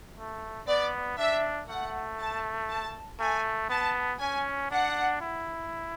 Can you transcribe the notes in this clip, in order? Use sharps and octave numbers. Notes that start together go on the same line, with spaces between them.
A3
B3 D5
D4 E5
A3 F#5
A5
A5
A3 G#5
B3 A5
C#4 G#5
D4 F#5
E4